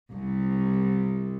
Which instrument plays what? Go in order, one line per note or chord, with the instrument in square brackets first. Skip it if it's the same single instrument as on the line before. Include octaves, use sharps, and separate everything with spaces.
[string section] C2